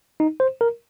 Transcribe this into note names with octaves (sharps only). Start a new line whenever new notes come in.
D#4
C5
A#4